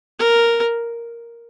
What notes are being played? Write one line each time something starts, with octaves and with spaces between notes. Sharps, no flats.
A#4